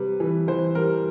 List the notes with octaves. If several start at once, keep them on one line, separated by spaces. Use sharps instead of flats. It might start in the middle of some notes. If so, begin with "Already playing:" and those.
Already playing: C3 G3 B4
E3
E3 C5
G3 A#4